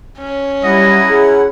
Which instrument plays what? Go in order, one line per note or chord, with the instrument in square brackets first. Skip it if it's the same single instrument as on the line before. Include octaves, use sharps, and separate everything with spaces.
[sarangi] C#4
[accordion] F#3 E4 F#5 [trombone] G3 [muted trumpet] D#5
[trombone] G#4